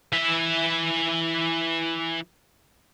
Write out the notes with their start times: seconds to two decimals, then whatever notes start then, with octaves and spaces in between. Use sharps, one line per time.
0.12 E3 E5